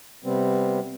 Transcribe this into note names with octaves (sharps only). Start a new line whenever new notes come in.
C3 G3 B3 C4